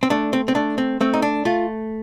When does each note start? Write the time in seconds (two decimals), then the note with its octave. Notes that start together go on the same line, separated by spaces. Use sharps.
0.03 C4
0.10 A3 D4
0.33 C4
0.48 C4
0.55 A3 D4
0.78 C4
1.01 A3 C4
1.14 D#4
1.22 D4
1.45 A3 F4